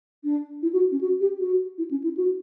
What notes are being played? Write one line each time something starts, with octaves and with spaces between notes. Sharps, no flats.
D4
E4
F#4
C#4
F#4
G4
F#4
E4
C#4
E4
F#4